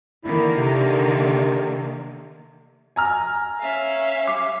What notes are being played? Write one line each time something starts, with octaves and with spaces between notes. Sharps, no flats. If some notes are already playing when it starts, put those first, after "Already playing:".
D3 D#3 A#3 E4
C3
G#5 A#5 F6
C#4 E5 F5
D6